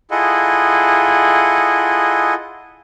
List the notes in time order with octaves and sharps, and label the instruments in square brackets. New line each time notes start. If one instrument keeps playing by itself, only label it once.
[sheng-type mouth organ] E4 F4 G#4 A4 D#5 F#5